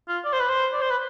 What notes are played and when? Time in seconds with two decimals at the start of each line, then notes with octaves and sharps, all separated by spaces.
0.08 F4
0.25 D5
0.33 C5
0.40 B4
0.49 C5
0.74 D5
0.82 C5
0.91 B4